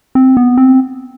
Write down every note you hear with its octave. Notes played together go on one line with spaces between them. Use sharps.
C4
B3
C4